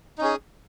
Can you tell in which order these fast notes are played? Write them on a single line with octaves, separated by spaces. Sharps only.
D#4 C#4 G#4